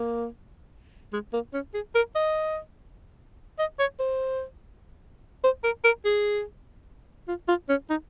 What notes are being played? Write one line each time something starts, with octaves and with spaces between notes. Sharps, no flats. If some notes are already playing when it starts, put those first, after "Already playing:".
Already playing: A#3
G#3
A#3
C#4
G#4
A#4
D#5
D#5
C#5
C5
C5
A#4
A#4
G#4
F4
F4
C#4
D#4